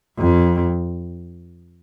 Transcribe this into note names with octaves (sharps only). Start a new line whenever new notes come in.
F2